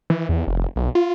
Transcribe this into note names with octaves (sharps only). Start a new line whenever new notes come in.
E3
E2
F1
B1
F4